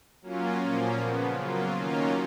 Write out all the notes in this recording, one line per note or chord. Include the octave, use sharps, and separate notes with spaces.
F#3 A#3 C#4 F4
A#2 F3 A#3 C#4
C#3 F3 B3
F#3 A#3 F4
D#3 F#3 A#3 C#4 F4